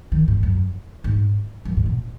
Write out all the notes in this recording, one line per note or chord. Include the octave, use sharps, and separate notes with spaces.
D#3
G#2
F#2
G#2
F#2
G#2
B2